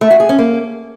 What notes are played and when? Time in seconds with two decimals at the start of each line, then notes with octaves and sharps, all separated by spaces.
0.01 A3
0.11 F#4
0.20 G#4
0.29 C#4
0.38 A#3